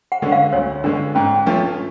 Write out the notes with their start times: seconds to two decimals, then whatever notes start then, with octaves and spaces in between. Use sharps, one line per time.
0.12 F#5
0.22 D3 G#3 C#4
0.32 F5
0.53 D2 C#5
0.84 D3 G#3 C#4 D4
1.15 G#2 C#4
1.46 F3 A3 C#4 D4 F4